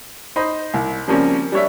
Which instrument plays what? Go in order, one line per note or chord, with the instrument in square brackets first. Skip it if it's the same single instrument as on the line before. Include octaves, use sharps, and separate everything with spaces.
[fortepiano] D#4 C5 D#5 B5
C2
C#3 F3 G3 A#3 C4 C#4
G3 D4 C#5 E5